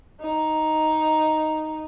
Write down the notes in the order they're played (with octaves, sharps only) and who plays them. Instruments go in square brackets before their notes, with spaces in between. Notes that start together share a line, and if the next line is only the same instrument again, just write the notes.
[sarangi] D#4